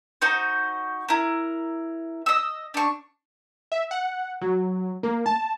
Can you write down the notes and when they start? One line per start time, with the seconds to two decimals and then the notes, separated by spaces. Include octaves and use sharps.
0.22 D#4 F#4 C5
1.09 E4 A#4
2.26 D#5 E6
2.74 D4 C#6
3.72 E5
3.91 F#5
4.41 F#3
5.03 A#3
5.26 A5